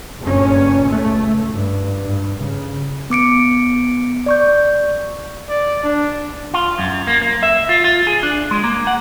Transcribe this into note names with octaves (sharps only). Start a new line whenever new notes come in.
F#1 G2 A#2 C#4
C#2 A3
G2
G2
C#3
B3 D6 C#7 D7
D5 C#6 G6
D5
D4
F4
F#2
A#3
A#3
E5
F4
F4
G#4
D4
G#3
A#3
F#5